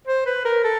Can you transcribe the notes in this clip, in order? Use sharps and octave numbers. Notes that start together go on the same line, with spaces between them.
C5
B4
A#4
A4